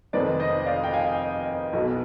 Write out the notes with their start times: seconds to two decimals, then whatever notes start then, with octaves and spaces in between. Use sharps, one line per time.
0.13 F1 F2 D#3 G#3 C4 B4 D5
0.40 C5 D#5
0.66 D5 F5
0.84 G5
0.93 F5 G#5
1.73 B1 B2 B3